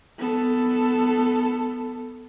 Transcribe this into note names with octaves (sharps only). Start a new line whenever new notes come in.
B3 A4